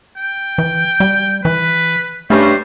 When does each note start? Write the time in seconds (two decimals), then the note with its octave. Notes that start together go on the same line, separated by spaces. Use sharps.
0.18 G5
0.58 E3
1.00 G3
1.45 E3 B4
2.30 G2 A3 C#4 C5